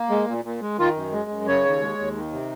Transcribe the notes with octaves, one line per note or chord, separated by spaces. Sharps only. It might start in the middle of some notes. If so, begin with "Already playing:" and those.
Already playing: A#3
G#3
A#2
A#2
G#3
D#3 F4
F#2
G#3
F#2
C#3 C#5
D#2
G#3
D#2
D#3
C3